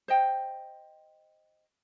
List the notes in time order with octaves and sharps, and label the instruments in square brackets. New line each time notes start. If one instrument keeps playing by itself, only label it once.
[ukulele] C5 D#5 G5